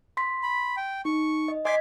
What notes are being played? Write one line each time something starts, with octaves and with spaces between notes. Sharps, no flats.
C6 B6
B5
G5
D#4 C#6
D#5
D#5 G#5 C6 D6 G#6 B6